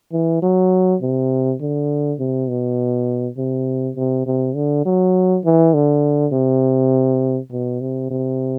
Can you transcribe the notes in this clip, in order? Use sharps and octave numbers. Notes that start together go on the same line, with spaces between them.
E3
F#3
C3
D3
C3
B2
C3
C3
C3
D3
F#3
E3
D3
C3
B2
C3
C3